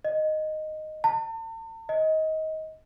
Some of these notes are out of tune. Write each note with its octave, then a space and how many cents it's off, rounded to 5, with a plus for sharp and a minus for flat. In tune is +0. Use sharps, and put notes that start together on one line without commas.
D#5 -5
A5 +45
D#5 +20